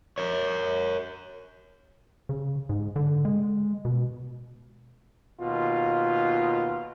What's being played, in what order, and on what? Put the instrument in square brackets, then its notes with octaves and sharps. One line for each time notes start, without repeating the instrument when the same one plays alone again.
[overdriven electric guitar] A#4 C#5
[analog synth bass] C#3
G#2
D3
G#3
B2
[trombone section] D#2 B2 F4